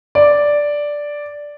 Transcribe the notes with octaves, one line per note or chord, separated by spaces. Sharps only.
D5